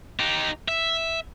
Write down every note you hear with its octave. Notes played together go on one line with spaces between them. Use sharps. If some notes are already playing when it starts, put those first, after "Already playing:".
D#4 G4
E5